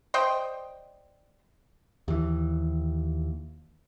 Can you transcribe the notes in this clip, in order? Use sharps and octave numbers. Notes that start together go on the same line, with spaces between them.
C5 D5 D#5 G5
D#2 E3